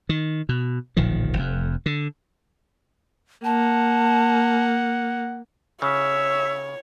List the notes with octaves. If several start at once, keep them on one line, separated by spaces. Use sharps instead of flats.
D#3
B2
D1 A#1 D#3 F3
F1 F2
D3
A#3 F#5 A5
C#3 C#5 E5